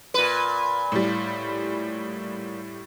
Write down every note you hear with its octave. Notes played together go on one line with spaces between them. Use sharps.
A#2 B4
A2 G3